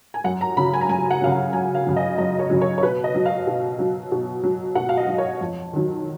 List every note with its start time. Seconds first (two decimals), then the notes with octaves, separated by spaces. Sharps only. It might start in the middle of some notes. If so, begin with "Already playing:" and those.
0.14 G#5
0.24 F#2 F#5
0.41 A#5
0.57 C#3 F#3 B5
0.74 G#5
0.81 A#5
0.89 F#2 G#5
1.11 F#5
1.21 C#3 F#3 F5
1.32 F#5
1.53 F#2 G#5
1.75 F5
1.86 C#3 F#3
1.96 D#5
2.18 F#2 D#5
2.39 C#5
2.50 C#3 F#3
2.61 C#5
2.78 C#5
2.83 B2 B4
3.04 D#5
3.15 F#3
3.26 F5
3.47 B2
3.79 F#3
4.12 B2
4.43 F#3
4.75 B2 F#5
4.89 F5
4.97 D#5
5.08 F#3
5.18 C#5
5.41 F2
5.73 D#3 F#3